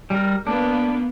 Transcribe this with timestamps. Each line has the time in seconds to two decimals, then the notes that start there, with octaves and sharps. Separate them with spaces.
0.10 G3 A#4
0.47 A#3 B3 D4